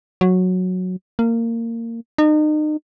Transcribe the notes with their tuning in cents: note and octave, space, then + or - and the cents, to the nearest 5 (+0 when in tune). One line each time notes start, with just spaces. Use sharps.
F#3 -10
A#3 -20
D#4 -35